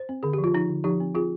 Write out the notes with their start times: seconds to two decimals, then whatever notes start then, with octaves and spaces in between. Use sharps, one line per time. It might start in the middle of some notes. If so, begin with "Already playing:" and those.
Already playing: C5
0.09 C4
0.23 D3 G#4
0.33 F3 G4
0.44 F4
0.54 F3 D#4
0.70 D3
0.84 F3 D#4 G4
1.00 C4
1.15 C4 F4 G#4